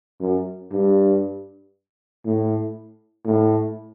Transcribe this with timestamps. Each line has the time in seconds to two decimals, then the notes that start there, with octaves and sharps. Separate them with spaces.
0.21 F#2
0.72 G2
2.25 A2
3.25 A2